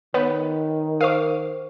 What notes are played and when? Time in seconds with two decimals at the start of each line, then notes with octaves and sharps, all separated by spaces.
0.14 D#3 B3 B4 C#5
1.01 A#4 C5 F5 C#6 D6